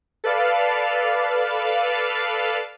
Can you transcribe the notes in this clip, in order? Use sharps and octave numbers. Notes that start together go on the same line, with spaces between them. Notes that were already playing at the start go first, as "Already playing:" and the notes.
A4 B4 D5 F5